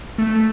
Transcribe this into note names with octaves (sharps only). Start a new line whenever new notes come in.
A3